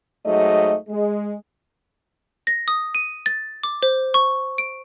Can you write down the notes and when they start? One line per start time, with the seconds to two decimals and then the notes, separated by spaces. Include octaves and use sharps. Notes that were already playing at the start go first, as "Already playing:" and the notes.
0.24 G#2 F#3 A3 D#5
0.88 G#3
2.47 A#6
2.68 D#6
2.95 D#7
3.26 A6
3.63 D6
3.83 C5
4.14 C#6
4.58 D7